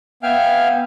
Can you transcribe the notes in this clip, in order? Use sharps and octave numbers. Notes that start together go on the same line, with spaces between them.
B3 E5 F5 G5 G#5 F6